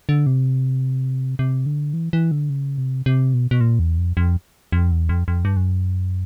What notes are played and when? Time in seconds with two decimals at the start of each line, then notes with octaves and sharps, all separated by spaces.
0.09 D3
0.27 C3
1.39 C3
1.66 D3
1.94 E3
2.13 E3
2.31 D3
2.50 C#3
2.78 C3
3.06 C3
3.34 B2
3.51 B2
3.61 A#2
3.79 E2
3.98 F2
4.17 F2
4.72 F2
4.91 E2
5.09 F2
5.28 F2
5.45 G2
5.57 F#2